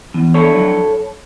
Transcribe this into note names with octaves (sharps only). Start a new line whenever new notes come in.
E2
D4 A4 C#5
F#3